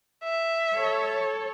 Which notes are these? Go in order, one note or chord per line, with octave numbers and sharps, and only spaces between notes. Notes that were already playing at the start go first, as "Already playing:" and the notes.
E5
A4 C#5